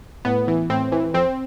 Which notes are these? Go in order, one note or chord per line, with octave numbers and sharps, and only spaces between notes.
A2 B3
E3
A2 C4
E3
F2 C4